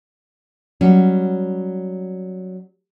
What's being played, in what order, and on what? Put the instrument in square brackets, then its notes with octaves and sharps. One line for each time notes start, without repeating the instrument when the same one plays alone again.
[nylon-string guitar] F#3 G3 C#4